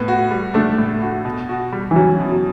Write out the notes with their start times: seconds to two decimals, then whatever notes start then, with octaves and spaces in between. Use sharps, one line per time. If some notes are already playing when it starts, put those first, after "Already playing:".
Already playing: A2 B3
0.08 F#4
0.31 G3
0.54 A3 D4
0.78 A2
1.02 F#4
1.25 B2
1.49 F#4
1.72 G3
1.91 E3
1.96 F#3 C#4
2.20 B2
2.32 F#3